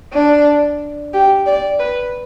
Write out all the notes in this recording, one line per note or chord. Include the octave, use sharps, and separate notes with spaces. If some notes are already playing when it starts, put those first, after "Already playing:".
D4
G4
D5
B4